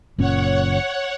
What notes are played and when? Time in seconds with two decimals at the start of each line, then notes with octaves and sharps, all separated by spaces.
0.18 F#1 A#2 C#4 C#5 F#5